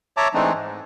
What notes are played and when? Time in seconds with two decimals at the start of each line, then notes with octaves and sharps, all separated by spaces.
0.17 C#5 E5 A5 A#5 D6
0.34 E3 G#3 A3 C4 D4 D#4
0.54 G#2